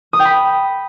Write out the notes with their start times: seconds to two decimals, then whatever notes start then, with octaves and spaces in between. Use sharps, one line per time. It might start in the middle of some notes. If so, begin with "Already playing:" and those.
0.13 D#6
0.19 G5
0.25 B5